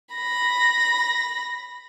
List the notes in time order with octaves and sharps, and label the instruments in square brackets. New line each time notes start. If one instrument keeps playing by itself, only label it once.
[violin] B5 A#6